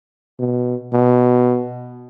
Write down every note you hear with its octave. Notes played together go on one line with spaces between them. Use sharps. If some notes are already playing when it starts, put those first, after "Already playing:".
B2
B2